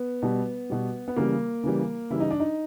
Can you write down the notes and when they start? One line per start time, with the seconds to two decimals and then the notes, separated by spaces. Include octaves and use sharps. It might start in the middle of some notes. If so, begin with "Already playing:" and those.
Already playing: B3
0.22 B2 G3
0.70 B2 G3
1.08 B3
1.16 C#3 E3 G3 A#3
1.63 C#3 E3 G3
2.10 C#3 E3 G3 E4
2.20 D#4
2.31 D4
2.40 D#4